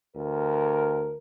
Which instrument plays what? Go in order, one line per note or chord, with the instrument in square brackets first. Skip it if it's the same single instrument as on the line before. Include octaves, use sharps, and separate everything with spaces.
[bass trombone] D2 [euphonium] A#4